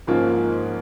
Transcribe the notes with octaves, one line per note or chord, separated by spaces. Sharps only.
G#2 F3 A#3 C#4 F4